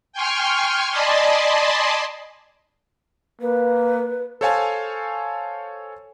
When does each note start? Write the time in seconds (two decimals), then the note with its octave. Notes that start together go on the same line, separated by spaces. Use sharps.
0.13 G5 G#5 C6 C#6 F6
0.91 D5 D#5 G#5 A5 B5 C6
3.41 A#3 B4
4.41 A4 C5 C#5 F5 G#5 A5